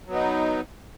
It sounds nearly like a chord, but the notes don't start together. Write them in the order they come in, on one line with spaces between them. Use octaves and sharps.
F#3 B3 D#4